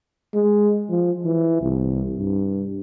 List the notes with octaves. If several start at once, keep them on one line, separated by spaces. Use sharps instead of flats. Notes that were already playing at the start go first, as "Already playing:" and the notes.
G#3
F3
E3
C2
G2